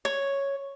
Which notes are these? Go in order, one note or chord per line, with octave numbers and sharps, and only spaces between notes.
C#5